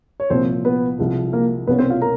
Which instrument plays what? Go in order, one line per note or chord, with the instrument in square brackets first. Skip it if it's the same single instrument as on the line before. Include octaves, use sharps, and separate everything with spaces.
[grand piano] C#5
[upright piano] C2 A#2 F3 A#3 [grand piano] C4 C5
[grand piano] B3 B4
[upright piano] C2 C3 F3 G#3
[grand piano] A#3 A#4
[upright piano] C2 B2 G3 A#3 C#4 [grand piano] B3 B4
[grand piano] C4 C5
F4 F5
A#4 A#5